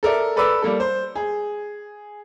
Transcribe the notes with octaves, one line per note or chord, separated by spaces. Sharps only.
A4 A#4 D5 E5
A4 B4 D5 B5 D6 E6
G3 A#3 A4
C5
G#4